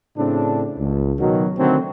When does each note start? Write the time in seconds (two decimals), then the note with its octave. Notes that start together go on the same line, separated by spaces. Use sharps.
0.17 A2 C#3 C4 D4
0.78 C#2
1.18 B2 D#3 F#3
1.57 D3 D#3 F#3 A3 C4